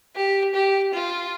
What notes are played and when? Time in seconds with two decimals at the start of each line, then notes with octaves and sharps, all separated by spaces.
0.16 G4
0.54 G4
0.93 F4